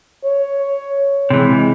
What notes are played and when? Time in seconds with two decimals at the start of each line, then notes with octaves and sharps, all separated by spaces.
0.25 C#5
1.30 C3 E3 G#3